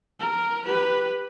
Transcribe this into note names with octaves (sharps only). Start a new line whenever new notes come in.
A#4
G4 B4